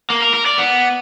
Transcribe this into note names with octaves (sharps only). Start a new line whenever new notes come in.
A#3
A#4
A#4
D5
B3